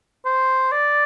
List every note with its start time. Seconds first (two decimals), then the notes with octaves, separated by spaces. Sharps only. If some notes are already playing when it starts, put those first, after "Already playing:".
0.25 C5
0.72 D5